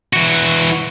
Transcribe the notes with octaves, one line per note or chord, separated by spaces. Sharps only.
E3 F#4